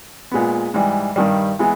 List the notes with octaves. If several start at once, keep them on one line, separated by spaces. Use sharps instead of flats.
A#2 G#3 B3
G#2 E3 G3
G2 D#3 G3
E3 G#3 B3